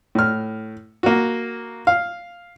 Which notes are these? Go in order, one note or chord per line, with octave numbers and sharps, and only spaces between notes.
A2 F6
A#3 F#4
F5